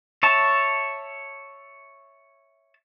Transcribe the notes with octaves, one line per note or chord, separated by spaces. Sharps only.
C#5 E5 A5